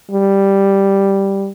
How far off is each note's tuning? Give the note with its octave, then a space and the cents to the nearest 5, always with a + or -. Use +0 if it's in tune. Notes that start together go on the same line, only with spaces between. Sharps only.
G3 +0